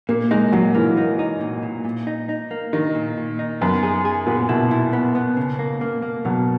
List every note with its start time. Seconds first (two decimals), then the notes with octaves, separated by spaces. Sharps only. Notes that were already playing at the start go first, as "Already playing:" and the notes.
0.09 A#2 A#3
0.31 G#3 D#4
0.52 A#2 F#3
0.75 E3 A#3
0.97 D#4
1.19 D#4
1.41 A#2
1.63 A#2
1.85 A#2
2.07 D#4
2.29 D#4
2.51 A#3
2.73 D#3 D#4
2.95 A#2
3.17 A#2
3.39 D#4
3.61 F#2 B3
3.83 G#4
4.05 G#4
4.26 A#2 B3
4.49 B2 E4
4.71 E4
4.93 B3
5.15 B3
5.37 C#3
5.59 A#3
5.81 A#3
6.02 A#3
6.25 B2 F#3